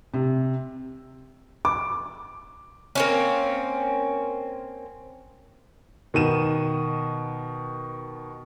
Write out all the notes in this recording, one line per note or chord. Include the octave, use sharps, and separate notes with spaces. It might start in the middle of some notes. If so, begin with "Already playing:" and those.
C3
D6
A#3 C4 C#4
B2 D#3 D#7 E7